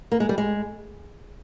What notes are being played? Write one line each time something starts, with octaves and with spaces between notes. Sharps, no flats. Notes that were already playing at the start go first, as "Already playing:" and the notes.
A#3
G#3
G3
G#3